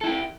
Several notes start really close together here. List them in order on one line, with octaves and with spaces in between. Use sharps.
A4 E4 G4